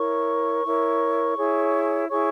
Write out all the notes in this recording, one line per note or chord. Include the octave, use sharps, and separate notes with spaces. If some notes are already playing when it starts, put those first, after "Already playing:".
Already playing: E4 A#4 C#5 C#6
E4 A#4 C#5
E4 G#4 C#5
E4 G#4 C#5 C#6